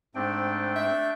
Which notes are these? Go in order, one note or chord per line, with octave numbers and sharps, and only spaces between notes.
G#2 A3 C4 D4 G5
E5